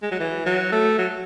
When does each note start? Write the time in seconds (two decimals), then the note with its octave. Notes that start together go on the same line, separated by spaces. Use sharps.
0.02 G#3
0.11 F#3
0.20 E3
0.46 F#3
0.72 A3
0.98 F#3